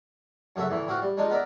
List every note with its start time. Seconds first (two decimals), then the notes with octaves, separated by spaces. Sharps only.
0.56 F#2 C#3 A3 F#4 E5
0.70 D2 A2 E3
0.87 A2 C4 F#4 F5 D6
1.02 G3
1.17 G#3 D4 D#4 F4
1.30 B3 A#4 D5 E5